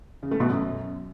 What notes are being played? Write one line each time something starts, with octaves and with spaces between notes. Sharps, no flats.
C#3
A3
B2
F#2